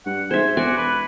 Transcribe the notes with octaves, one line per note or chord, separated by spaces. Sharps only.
G2 F#5
G#2 C5 E5 G#5
E1 F#4 D5 G#5
B4